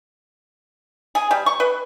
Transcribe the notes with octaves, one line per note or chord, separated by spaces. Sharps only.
G#4
G3
C#6
B4